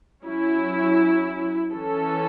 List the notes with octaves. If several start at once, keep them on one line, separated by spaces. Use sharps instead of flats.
F#3 C#4 E4
E3 C#4 A4